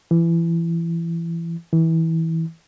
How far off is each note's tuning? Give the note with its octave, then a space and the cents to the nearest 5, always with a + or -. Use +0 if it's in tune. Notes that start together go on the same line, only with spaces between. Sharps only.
E3 +25
E3 -20